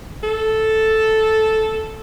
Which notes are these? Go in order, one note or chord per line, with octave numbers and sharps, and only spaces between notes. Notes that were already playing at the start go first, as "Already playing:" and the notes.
A4